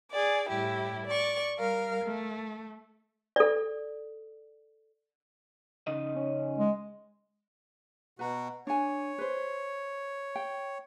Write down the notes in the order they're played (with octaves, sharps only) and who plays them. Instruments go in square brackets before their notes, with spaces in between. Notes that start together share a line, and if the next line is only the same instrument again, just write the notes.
[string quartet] G#4 D5
A2 G3 E4 G4
D5 C#6
G3 A#4 F5
A3
[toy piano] A4 D5
[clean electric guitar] C#3 D#4 D#5
[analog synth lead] C#4
[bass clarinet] G#3
[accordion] B2 F#4 [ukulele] B4 A#5
[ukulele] D4 G#5 [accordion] C#5
[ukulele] B4 C5
G5